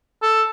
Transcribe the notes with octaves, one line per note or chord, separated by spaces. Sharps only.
A4